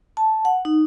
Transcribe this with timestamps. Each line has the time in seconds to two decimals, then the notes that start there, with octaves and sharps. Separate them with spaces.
0.17 A5
0.45 F#5
0.65 D#4